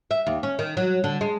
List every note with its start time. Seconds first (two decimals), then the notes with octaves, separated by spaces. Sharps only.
0.11 E5
0.27 D#2
0.43 C#4
0.59 D#3
0.77 F#3
1.04 D3
1.21 G#3